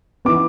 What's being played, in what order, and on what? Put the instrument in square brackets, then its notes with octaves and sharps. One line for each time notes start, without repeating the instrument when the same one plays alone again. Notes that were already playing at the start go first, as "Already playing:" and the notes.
[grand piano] E3 B3 D6